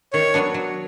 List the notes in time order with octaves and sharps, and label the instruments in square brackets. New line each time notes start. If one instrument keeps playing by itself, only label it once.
[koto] D#3 [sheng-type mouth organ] C#5
[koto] F#3 B3 D4
F#3